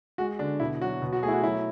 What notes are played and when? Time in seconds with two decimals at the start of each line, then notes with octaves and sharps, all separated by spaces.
0.18 G#3 F#4
0.39 D3 D4
0.60 B2 E4
0.81 F#3 F#4
1.02 B2
1.13 F#4
1.22 A3 G#4
1.28 E4
1.33 F#4
1.43 F#3 E4